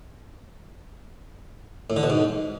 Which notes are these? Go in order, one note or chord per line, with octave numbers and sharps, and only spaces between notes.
A2
D3
B2
G#2